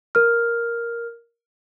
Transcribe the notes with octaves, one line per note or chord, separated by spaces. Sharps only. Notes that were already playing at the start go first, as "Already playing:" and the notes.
A#4 F6